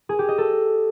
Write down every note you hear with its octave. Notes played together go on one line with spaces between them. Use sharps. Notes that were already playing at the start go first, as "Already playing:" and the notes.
G#4
G4
D#5
A4